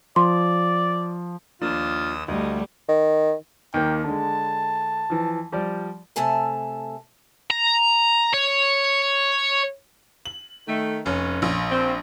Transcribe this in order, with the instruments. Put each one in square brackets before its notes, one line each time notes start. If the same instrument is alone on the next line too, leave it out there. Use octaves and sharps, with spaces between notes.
[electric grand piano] F3 [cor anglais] D5 [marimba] C6
[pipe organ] D#2 D#6 E6 [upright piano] F3 A#3 D4 [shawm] F4
[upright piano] D2 [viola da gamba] G3 A3 [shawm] D#5
[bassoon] D#3
[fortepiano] D#2 A#3 [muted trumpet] G5
[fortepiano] D3 G#3 [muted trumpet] A5
[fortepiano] E3 F3
F3 G3 D5
[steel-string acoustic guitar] C3 A3 A4 G#5 A5
[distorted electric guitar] A#5
C#5
[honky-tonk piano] F#7
[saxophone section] D#3 A3
[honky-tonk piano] F1 [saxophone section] C#4
[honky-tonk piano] A#1
[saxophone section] C4